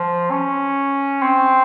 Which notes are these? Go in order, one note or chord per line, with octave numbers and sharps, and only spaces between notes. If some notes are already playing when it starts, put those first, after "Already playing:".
Already playing: F3
C#4
C4